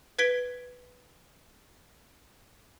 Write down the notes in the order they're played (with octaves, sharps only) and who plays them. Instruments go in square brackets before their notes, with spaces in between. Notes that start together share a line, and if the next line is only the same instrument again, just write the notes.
[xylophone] B4 G#6 B6 D7 G7